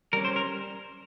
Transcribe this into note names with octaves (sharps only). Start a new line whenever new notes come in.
G3 C#4 A#4
C5
A#4